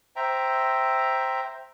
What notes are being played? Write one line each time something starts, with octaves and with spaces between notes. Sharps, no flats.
C5 E5 G5 A#5